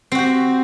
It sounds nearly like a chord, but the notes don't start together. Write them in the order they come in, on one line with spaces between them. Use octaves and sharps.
C4 F#4 G4